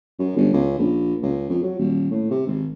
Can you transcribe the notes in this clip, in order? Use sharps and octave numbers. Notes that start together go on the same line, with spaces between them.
F#2
G1
C#2
A#1
C#2
F2
F#3
D#1
A2
C3
G#1